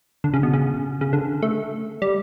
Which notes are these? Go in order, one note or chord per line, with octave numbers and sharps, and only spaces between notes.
D3
C#3
B2
C#3
C#3
D3
A3
G3